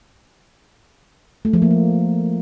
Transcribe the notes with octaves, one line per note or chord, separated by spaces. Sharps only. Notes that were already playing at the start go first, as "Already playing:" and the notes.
A3
F3
A#3
F3